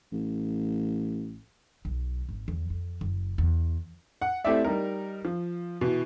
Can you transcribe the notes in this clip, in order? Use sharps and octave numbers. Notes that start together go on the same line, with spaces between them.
A1
B1
G#1
E2
F2
F#1
E2
F#5
A3 C4 E4 G4 D5 E5
G3 D#4 A#4
F3
B2 E3